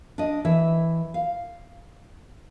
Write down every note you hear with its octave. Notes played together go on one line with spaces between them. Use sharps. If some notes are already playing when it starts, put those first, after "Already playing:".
D4 D#5
E3 E5
F5